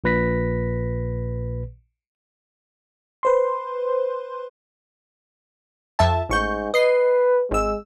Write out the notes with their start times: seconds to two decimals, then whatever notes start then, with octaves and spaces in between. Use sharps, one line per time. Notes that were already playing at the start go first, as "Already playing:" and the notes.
0.04 A#1 A#2 B4 A#6 B6
3.23 B4 C5 C6
5.99 F2 E5 A5
6.30 A1 G#2 C#6 G6
6.74 B4 D#5 C7
7.51 G#1 G#3 E6